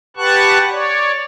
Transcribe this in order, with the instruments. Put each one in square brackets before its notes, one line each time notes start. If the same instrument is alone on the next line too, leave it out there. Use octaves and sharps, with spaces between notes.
[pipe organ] G4 B4 F#5 A5 C#6 F#6
C#5 D5